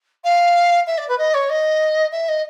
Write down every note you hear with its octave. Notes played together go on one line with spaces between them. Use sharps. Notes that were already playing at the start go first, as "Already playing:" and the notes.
F5
E5
D5
B4
D#5
C#5
D#5
E5
D#5